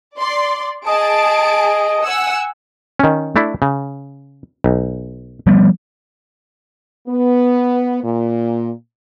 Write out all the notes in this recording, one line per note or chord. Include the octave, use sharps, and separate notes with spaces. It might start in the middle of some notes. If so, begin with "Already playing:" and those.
D5 C6
G#4 D#5 A5 D7
F#5 G#5 E6
D#3 C#4
A3 D4 E4
C#3
B1
F3 G3 B3
B3
A#2